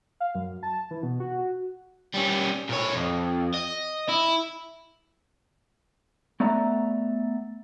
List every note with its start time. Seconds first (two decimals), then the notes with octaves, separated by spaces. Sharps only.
0.20 F5
0.35 F#2
0.63 A5
0.91 E3
1.03 B2
1.20 F#4
1.38 F#4
2.14 G3 C#4
2.69 A#2 C#5
2.95 F2
3.54 D#5
4.09 E4
6.40 A3 B3 D5 E5 A#5